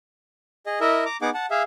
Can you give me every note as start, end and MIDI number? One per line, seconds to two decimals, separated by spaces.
0.66 0.80 68
0.66 0.80 75
0.81 1.04 64
0.81 1.04 70
0.81 1.04 75
0.81 1.04 76
1.06 1.17 82
1.06 1.17 86
1.22 1.30 59
1.22 1.30 63
1.22 1.30 68
1.22 1.30 78
1.22 1.30 86
1.34 1.46 78
1.34 1.46 81
1.51 1.63 68
1.51 1.63 76
1.51 1.63 77